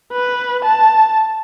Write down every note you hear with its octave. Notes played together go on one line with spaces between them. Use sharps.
B4
A5